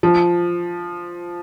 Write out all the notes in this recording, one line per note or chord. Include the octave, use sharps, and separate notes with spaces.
F3